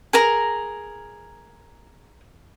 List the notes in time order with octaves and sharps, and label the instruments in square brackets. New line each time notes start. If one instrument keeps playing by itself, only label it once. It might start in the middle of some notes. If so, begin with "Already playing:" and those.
[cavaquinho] G#4 A#4 A#5